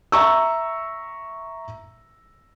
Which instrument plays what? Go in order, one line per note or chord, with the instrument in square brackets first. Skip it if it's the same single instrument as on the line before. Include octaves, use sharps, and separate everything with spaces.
[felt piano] E5 A#5 C#6 E6